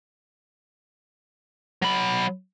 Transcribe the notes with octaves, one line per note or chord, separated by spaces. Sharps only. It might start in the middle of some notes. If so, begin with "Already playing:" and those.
F#3 B5